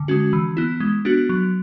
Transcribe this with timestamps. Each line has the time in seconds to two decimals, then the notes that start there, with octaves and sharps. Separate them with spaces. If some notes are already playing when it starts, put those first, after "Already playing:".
Already playing: D3
0.08 G#3 C#4 F#4
0.33 E3
0.57 B3 E4
0.80 G#3
1.05 B3 D4 F#4
1.29 F#3